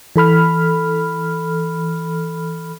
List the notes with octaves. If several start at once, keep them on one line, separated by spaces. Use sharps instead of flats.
E3 A4 B5 F6